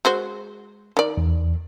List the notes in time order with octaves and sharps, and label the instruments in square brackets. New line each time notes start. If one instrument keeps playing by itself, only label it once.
[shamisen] G#3 F#4 C5
D#3 D5
[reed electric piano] E2